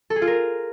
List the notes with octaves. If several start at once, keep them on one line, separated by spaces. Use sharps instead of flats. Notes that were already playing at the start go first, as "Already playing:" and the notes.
A4
G#4
F4
A#4